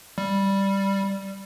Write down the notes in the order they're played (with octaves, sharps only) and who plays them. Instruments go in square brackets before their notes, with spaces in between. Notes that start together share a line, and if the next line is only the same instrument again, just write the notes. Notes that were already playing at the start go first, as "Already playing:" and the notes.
[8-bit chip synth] G3